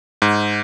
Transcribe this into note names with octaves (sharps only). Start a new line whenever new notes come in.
G#2